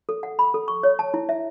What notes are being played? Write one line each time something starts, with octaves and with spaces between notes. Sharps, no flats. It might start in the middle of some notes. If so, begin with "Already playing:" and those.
A4
F#5
B5
A4
C#6
C#5
A5
E4
E5